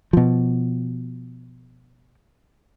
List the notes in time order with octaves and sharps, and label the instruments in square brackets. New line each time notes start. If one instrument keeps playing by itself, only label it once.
[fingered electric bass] B2 F3